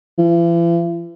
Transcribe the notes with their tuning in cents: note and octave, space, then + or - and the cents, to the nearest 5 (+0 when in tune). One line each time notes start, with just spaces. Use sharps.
E3 +45